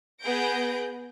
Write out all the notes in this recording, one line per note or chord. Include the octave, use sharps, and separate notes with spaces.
B3 G#4 B4 G6 A#6 D7